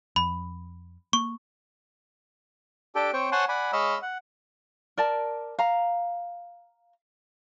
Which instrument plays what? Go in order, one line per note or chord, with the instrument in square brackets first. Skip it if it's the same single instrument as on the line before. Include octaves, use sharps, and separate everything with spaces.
[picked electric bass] F2 [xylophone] B5
[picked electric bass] A#3 [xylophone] C#6
[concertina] D4 G4 A4 G5
C4 C5 C#5 G5 C#6
C5 C#5 F#5 G#5 A5 C6
D5 F#5 G#5 B5
G#3 C#5 D#5 F5 B5 E6
F#5
[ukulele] A#4 D5 A5
F5 A#5